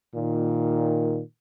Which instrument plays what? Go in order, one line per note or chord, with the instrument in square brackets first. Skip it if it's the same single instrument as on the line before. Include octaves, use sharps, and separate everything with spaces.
[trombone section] A#2 D#3